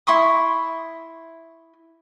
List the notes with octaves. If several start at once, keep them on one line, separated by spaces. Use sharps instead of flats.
E4 C6 C#6 D#6